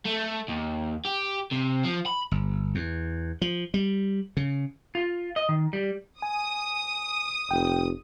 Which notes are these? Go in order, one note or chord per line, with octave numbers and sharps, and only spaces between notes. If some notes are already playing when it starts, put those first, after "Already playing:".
A3
D#2
G4
C3
F3
B5
G1
E2
F3
G3
C#3
F4
D#5
D#3
G3
G#5 D#6
F1 G5